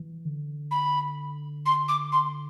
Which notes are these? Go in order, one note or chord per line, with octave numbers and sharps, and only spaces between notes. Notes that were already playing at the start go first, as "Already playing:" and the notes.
Already playing: E3
D3
B5
C6
D6
C6